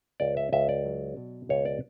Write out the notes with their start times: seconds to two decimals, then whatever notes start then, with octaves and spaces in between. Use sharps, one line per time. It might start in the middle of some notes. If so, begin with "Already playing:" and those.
0.20 C#2 D5
0.37 E5
0.52 C#2 E5
0.69 D5
0.85 F#3
1.17 B2
1.49 C#2 C#5
1.65 D5